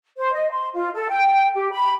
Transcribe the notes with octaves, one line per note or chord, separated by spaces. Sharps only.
C5
D#5
C6
F4
A4
G5
G4
B5